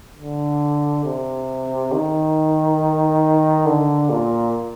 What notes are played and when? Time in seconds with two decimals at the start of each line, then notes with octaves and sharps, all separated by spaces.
0.18 D3
1.05 C3
1.92 D#3
3.66 D3
4.10 A#2